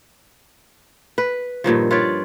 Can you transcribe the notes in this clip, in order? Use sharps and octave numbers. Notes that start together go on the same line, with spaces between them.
B4
G2 A#2 D#3 F3
F4 B4 C#5 D5